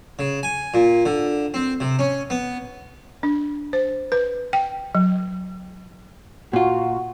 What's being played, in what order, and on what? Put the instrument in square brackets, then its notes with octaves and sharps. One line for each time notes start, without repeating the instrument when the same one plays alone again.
[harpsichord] C#3
G#5
A#2
D3
C4
C3
C#4
B3
[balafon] D4
C5
B4
G5
F#3
[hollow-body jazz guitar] A#2 F4 [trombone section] F#4